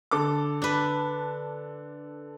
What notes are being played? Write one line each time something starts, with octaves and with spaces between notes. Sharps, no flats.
D3 A4 D6
D4 B4